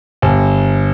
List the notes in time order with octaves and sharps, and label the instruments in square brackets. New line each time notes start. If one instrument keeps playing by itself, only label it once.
[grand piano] G1